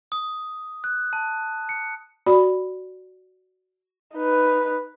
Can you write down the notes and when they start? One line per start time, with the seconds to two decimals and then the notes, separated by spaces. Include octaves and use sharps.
0.12 D#6
0.84 F#6
1.13 A5
1.69 C#7
2.27 F#4 D5 B5
4.15 D#4 B4